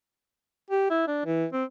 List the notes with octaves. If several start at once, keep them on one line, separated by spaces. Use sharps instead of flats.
G4
E4
D4
E3
C4